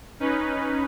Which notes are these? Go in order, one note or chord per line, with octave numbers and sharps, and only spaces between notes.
C#4 D#4 B4